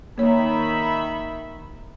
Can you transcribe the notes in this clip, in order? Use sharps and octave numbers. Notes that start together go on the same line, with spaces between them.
D#3 A#3 C#5 E5 B5